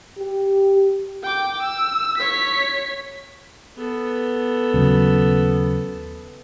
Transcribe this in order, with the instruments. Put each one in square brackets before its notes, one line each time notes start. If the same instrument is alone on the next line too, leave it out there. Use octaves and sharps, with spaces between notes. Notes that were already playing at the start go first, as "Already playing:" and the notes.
[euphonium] G4
[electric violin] G5 D6
E6
C#5 B6
[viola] B3 A4
[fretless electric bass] D#2 C#3 F#3